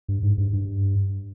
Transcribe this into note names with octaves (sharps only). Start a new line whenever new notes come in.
G2
G#2
G2
G2